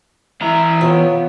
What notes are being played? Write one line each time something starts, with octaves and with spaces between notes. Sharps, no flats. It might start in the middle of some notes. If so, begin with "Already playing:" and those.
E3 E4 E5 A#5
C3 B3 F4 C#5